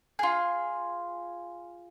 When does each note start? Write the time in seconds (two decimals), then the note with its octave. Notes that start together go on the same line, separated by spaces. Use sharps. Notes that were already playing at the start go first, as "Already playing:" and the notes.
0.19 F4 G#4